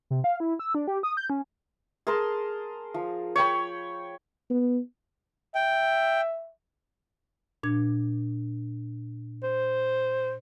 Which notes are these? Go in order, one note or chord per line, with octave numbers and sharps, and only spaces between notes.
C3
F5
E4
E6
D4
G4
D#6
G6
C#4
G#4 A#4 A5 C6
F3
C#5 G5 B5
B3
E5 G5
A#2 D4 G#6
C5